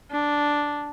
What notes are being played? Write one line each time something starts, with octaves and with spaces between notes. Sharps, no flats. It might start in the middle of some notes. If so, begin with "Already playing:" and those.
D4